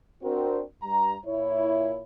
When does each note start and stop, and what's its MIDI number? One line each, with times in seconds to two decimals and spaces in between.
0.23 0.62 60
0.23 0.62 62
0.23 0.62 66
0.23 0.62 70
0.82 1.16 43
0.82 1.16 82
1.25 2.03 46
1.25 2.03 64
1.25 2.03 73